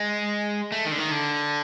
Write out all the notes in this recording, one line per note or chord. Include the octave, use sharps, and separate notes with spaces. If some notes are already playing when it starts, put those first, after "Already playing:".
Already playing: G#3
A3
D#3
D3
D#3
D3